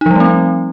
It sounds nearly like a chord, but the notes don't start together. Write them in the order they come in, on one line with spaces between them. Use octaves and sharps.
D#4 F3 G3 A3 C4